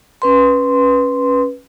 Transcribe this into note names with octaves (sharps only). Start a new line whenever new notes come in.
C#4 B4 C6